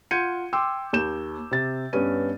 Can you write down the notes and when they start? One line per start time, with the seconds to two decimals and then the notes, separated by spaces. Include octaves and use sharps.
0.11 F4 F#5 G6 G#6 C#7 D#7
0.53 G5 C6 D6 E6
0.93 D#2 G6 E7
1.51 C3 A6
1.93 G2 B3 C#4 D#7